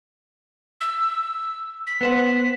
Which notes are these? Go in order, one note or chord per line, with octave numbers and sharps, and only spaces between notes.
E6
B6
B3 C5 F#5